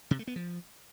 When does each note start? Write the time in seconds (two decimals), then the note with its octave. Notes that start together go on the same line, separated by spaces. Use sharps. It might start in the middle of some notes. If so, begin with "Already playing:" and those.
0.11 C3
0.19 A3
0.27 B3
0.36 F3